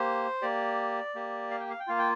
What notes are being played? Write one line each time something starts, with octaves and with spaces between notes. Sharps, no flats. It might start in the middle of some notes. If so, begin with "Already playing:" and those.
Already playing: A#3 G4 C5
A#3 G4 D5
A#3 G4
F5
G5
F5
G5
A#3 F4 F5
G5